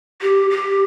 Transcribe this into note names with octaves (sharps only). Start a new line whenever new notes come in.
G4
G4